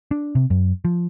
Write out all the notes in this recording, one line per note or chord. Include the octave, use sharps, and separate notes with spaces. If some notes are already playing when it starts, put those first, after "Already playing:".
D4
C3
F#2
F3